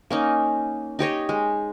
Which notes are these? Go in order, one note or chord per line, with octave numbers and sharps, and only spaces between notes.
A#3 C#4 D#4
D#4 G4 C#5 D#5
G#3